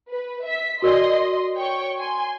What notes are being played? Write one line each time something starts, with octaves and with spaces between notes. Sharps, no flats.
B4
E5 B6
F#4 A#4 D5 D#5 C6
C#5 G5 C#6
G#5 C6